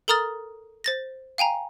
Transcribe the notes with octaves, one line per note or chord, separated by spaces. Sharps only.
A4 A#4 A#5 D#6 F6 A6
C5 A6 A#6
F5 G5 G#5 A#5